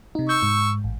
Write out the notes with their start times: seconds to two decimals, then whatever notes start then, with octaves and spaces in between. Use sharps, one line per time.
0.15 C3 D#4
0.29 C#6 E6 G6
0.43 G#2
0.84 A1